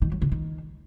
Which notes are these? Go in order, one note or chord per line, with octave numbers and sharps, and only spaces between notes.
D#3
F#3
D3
D#3